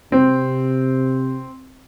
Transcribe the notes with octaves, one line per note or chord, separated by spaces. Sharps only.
C3 C4